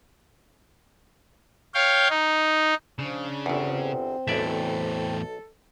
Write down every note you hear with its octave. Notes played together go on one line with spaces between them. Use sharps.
C#5 F5 G5
D#4
C#3 F3 D4
G1 E2 C4
B1 E2 A2 A4 D5 E5